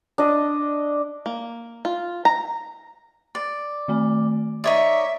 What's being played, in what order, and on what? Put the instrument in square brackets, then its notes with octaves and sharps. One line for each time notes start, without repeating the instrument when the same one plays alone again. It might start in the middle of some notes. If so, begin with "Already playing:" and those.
[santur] D4 D#5
[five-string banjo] A#3
F4
A#5
[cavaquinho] D5
[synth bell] D#3 A3 G#5
[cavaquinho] D#4 C#5 D5 [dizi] E5 [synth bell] D#6 A#6